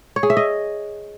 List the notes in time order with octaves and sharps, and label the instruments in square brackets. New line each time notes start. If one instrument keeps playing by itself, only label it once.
[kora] C#5
G#4
E5
D#5